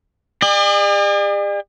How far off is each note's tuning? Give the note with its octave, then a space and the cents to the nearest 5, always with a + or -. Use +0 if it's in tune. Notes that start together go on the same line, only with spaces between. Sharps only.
G#4 -45 D5 +40